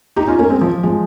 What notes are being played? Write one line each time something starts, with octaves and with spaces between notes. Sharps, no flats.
D#4 G4
C#4 F4
A#3 C#4
G#3 C4
F3
F3 G#3